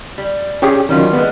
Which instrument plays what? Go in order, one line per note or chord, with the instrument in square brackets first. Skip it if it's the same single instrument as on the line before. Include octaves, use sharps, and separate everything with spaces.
[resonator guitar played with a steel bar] G3
[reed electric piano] C#4 G4 G#4
[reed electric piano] D#3 F#3 [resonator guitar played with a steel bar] G3 C#4 F4
[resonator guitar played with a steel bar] G3 G#3 [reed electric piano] B3